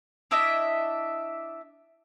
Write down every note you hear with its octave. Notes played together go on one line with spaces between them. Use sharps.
D4 E4 D#5 E5